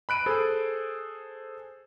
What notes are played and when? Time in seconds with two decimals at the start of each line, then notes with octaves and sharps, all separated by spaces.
0.09 B5 F#6 D7 D#7
0.26 G#4 A4 C5